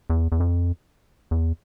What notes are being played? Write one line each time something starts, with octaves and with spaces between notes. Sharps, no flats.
E2
E2
F2
E2